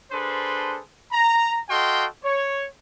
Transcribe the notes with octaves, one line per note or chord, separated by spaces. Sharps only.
D4 G#4 A4 B4 C5 C6
A#5
F#4 A4 D#5 F5 G5 C6
C#5